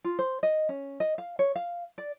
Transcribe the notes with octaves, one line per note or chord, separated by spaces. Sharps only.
F4
C5
D#5
C#4
D#5
F5
C#5
F5
D5